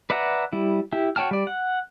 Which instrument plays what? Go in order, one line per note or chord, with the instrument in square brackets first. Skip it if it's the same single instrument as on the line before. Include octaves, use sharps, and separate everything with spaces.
[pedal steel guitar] B4 D5 E5 F#5 A#5
G3 E4
E4 G4
F#4 C#5 G5 A5 F6
G3 D5
F#5